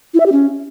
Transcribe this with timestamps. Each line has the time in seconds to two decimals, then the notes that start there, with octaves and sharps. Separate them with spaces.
0.14 E4
0.20 E5
0.26 G4
0.32 C#4